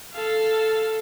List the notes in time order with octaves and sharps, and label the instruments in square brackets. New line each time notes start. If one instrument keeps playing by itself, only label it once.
[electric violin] A4 F5